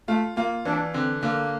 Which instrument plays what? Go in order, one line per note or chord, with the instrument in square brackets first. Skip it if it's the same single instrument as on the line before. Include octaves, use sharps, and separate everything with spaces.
[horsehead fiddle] A3 [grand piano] F4
[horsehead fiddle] A#3 [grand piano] F4
[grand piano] E3 [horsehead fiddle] D4
[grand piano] D3 [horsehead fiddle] C4
[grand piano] D3 [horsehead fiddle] A#3